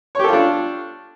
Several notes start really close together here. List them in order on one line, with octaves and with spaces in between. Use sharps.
C#5 G4 A4 F4 D4